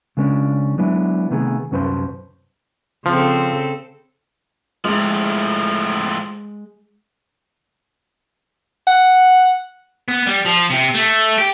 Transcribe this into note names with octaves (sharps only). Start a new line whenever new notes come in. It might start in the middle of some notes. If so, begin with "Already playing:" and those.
C#3 G#3 B3 C#4 D4
F#3 G#3 B3 D4 E4
C3 D#3 A3 B3 G#4
C2 F#2 C#4 B4 C5 C6
C#3 F3 C4 A4
A2 F3 G#3
F#5
B3
G3
F3
C3
A3
G4